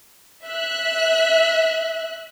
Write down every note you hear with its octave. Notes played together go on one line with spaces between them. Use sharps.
E5 F#6